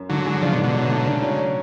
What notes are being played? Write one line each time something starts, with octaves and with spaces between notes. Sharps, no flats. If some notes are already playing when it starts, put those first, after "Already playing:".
Already playing: F#2
G#2 D3 F#3
G#3
C#3 F3 D4
B2 D3
G#2
B2 D3
F#3
A3
C#3 D4
F#3
C#4